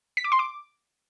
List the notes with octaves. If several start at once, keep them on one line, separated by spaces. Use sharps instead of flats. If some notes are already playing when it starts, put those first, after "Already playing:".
B6
D6
C6
D6